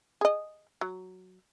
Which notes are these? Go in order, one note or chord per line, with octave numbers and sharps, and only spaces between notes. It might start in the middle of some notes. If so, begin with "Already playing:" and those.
G#4 D#5
F#3